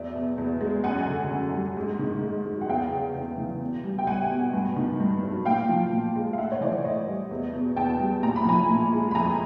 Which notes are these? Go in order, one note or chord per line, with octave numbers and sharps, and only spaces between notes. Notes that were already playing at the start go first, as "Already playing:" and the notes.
Already playing: E2 F#3 D5 E5
B2
E2
G#3
F#2 F#5 G#5
D3
F#2
G3
G#2
D#3
G#2
F#3
F#5
E2 F5 G5
C#3
E2
E3
B2
G3
G5
G3 F#5 G#5
B2
G2
D#3
G2
F#3
A#2 F5 G5
F3
A#2
G#3
F5
A2 E5 F#5
C#5
E3 C5 D5
A2 C#5 D#5
G3
E2
B2
E2 G5 A5
G3
A#2 A#5
B5
F3 G#5 A#5
A#2
G#3
B5
F2 G#5 A#5